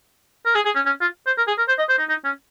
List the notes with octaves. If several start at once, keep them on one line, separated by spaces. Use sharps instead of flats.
A#4
G#4
G#4
C#4
C#4
F4
C5
A#4
G#4
A#4
C5
D#5
C5
D#4
D#4
C#4